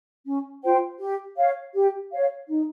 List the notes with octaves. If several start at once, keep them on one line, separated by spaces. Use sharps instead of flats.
C#4
F4 C5 G5
G4
C#5 F5
G4
C#5 F5
D#4